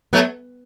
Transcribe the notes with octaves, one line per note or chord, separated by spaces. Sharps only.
F#3 A3 B3